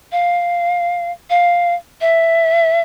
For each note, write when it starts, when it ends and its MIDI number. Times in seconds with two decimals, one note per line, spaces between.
0.12 1.11 77
1.30 1.75 77
2.01 2.82 76